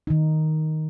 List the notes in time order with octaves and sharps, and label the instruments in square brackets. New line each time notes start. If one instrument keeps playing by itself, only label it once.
[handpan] D#3 D#4